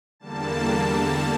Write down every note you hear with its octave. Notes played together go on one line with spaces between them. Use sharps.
E2 D3 G3 A#3 A5